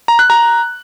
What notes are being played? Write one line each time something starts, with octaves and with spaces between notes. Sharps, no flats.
A#5
F#6
A#5